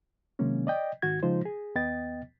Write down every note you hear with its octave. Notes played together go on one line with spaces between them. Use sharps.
C3 D#3 F#3 G#3 A#3 C#4
D5 D#5 G5
G#2 D#3 F#4 G#6
C#3 F3 G#3 D#4 F4 C5
G#4
D#2 B3 D#5 G5 A6